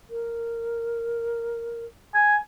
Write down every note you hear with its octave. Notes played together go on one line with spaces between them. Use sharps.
A#4
G#5